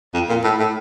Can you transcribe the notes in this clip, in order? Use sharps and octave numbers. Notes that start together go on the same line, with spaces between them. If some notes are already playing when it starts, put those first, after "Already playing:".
F2
A#2
A2
A2